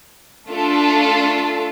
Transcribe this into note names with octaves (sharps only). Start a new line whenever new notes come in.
A3 D4 F4 A4